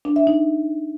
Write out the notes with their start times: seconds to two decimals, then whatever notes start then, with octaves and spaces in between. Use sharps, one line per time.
0.05 D4
0.16 E5
0.27 D#4